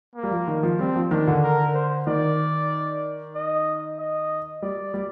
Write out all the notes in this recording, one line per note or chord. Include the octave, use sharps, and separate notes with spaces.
A#3
G3
F3
D#3
F3
G3 C4
F3
D#3 D4
D3
A#4
C5
D#3 D5
D#5
D#5
G3 D5
G3